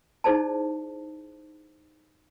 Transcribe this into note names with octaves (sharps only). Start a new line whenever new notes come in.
D#4 E4 G#4 C5 D5 A5